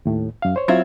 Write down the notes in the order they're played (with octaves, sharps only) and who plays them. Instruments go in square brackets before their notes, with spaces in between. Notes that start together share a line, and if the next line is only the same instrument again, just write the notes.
[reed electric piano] D#2 A2
F#2 F5
C5 C#5
[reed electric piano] F#3 E5 G#6 [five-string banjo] C4 E4 F4